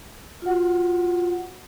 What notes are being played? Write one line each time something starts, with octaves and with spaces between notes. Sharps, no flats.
F4 F#4 F#5